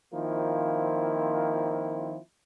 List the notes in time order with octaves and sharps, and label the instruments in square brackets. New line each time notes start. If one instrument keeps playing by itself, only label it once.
[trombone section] D#3 F3 A#3 C4 E4 F4